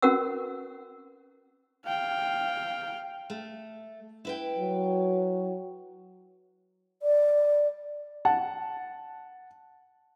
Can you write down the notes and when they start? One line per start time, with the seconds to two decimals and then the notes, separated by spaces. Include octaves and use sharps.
0.02 C#4 F#4 A#4 B4 F#5 E6
1.86 F5 G5
3.30 A3
4.25 E4 B4 G5
4.58 F#3
7.03 D5
8.25 F#5 A5